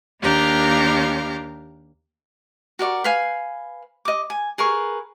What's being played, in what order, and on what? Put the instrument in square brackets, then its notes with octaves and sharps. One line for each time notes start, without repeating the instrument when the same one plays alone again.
[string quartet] D#2 A#3 D4 G4 F5 A#5
[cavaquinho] F#4 A#4 D5 C#6
B4 F5 G#5
D#5 D6
G#5
G#4 A#4 B4 C#6